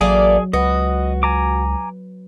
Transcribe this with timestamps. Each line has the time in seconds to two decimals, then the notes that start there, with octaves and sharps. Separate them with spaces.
0.01 A1 F#3 A3 A#3 G#4 D5
0.53 C#2 F#4 B4 D#5
1.23 G#5 A#5 D6